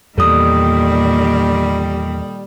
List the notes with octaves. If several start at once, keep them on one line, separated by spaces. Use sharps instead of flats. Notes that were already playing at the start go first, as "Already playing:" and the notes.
E2 A#2 D#3 G3 A4 D#6